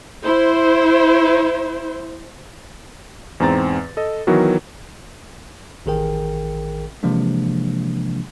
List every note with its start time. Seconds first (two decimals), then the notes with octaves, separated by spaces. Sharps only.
0.22 E4 C5
3.40 E2 G#2 C4 A#5 A6
3.97 A4 D#5
4.27 D#3 E3 F#3 B3 F#4 A#4
5.86 A1 D#3 G#4 A#4 G5
7.03 C3 E3 F3 G#3 A#3 D4